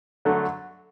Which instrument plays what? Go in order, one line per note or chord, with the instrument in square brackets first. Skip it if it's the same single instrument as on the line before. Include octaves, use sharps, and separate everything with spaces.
[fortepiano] D3 F#3 A3